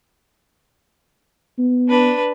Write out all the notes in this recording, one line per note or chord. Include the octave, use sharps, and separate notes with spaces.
B3
D4 B4